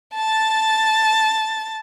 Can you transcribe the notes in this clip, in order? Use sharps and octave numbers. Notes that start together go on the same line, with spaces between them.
A5 A6